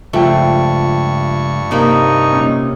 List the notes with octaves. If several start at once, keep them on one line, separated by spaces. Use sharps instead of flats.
C#2 G2 F3 A3 E5 G5 C#6
C3 A#3 D#4 B5
A#2 C#4